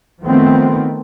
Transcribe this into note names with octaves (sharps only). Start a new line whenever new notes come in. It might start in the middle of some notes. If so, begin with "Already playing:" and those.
D#3 F3 A3 B3 C4